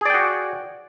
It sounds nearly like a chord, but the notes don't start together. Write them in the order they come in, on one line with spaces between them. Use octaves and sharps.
G#4 D5 G5 F#4